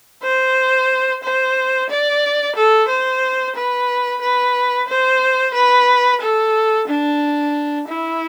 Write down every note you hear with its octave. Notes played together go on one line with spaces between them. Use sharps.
C5
C5
D5
A4
C5
B4
B4
C5
B4
A4
D4
E4